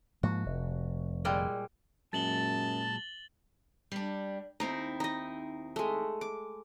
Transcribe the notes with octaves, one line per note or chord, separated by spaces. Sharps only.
G#2 F3 A#3 F#4
F1
A#2 G3 G#3
F#2 A#2 F#3 G#3 A5 A6 F#7 G7
G3 D4
D#2 C4 D#4 E4
D#4 D#5
G#3 A3
D6